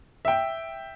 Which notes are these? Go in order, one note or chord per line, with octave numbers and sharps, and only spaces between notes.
E5 G5